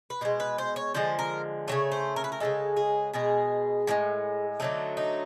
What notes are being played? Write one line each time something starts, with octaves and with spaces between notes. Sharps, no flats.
B4
B2 G#3 C5
B4
C5
C#5
D3 F3 G#3 C5
A#4
C#3 F#3 A3 C#5
C5
A#4
B4
A#4
C#3 E3 G#3 A4
G#4
B2 G#3 G#4
A2 F3 G#3
D3 F#3 A3 D#4
D#4